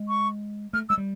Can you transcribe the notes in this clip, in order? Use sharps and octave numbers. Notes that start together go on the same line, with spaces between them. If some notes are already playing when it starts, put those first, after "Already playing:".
Already playing: G#3
C#6
A3 F6
G#3 E6
G3